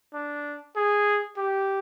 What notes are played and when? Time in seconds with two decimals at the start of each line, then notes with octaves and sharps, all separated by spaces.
0.14 D4
0.76 G#4
1.38 G4